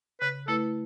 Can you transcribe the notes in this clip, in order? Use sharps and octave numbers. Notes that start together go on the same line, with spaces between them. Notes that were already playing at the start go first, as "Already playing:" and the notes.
C#3 B4
A3 E4 A4 B4